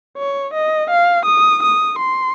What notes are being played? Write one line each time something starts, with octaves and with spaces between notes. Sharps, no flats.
C#5
D#5
F5
D#6
D#6
C6